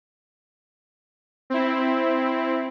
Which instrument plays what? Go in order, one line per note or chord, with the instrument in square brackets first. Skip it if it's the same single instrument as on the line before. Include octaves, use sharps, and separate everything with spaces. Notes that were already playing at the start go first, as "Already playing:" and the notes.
[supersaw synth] C4 E4